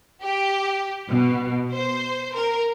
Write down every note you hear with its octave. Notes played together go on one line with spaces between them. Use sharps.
G4
B2
C5
A#4